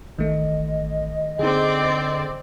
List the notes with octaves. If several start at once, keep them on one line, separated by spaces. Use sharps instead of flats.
A1 D#3 A3 D#5
D3 C4 D#4 G#4 D5